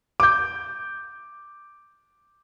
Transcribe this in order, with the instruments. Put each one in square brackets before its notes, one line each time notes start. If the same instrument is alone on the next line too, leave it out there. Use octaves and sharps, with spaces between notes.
[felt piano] D6 G6